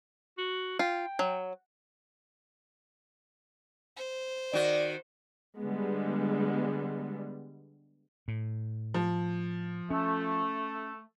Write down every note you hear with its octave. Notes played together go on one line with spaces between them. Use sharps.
F#4
F4 G5
F#3
C5
D#3 F#4 D5
D3 G3 G#3 B3
A2
F3
A3 C#4